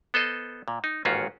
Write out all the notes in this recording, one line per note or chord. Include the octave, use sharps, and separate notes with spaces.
B3 A4 C5 D#5
A#2
D#4
A1 D#2 G#2 C#4 F4 F#4